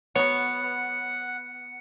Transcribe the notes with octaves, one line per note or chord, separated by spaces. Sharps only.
F#3 B3 C#5 F#5 C#7